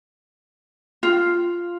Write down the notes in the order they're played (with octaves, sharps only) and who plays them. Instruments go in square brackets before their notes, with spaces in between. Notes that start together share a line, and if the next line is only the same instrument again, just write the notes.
[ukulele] F4